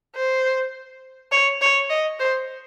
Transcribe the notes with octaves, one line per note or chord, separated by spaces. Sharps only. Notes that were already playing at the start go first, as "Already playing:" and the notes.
C5
C#5
C#5
D#5
C5